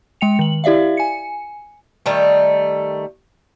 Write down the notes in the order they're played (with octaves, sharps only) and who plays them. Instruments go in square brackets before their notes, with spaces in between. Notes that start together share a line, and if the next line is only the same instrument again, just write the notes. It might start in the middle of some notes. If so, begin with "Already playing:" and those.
[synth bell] G#3 G5 C#7 F7
D#3 F#7
E4 G4 D5 E5 F5
G#5 C#7
[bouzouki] D#3 G3 A3